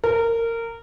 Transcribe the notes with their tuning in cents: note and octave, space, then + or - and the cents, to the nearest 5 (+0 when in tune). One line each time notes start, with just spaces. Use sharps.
A#4 -20